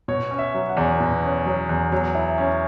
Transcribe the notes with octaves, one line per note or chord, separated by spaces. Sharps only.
B2 C#5
C#4
E5
F#3
F#5
E2
B2
C#4
F#3
E2
F#3
E4
C#4